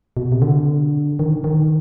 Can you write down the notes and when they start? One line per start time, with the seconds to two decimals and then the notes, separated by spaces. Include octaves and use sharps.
0.17 B2
0.32 C3
0.42 D3
1.19 D#3
1.44 D#3